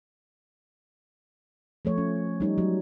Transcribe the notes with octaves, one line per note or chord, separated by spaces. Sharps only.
F3 A3 C#5
C#4
G3 D#4 C#5
F#3